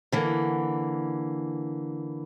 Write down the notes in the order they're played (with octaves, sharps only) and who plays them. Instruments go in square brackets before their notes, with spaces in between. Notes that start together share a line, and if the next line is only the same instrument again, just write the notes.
[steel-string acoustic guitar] D3 E3 A#3